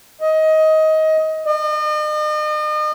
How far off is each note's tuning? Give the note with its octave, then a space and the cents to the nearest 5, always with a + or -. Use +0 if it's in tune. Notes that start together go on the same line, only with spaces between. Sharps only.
D#5 +20
D#5 -40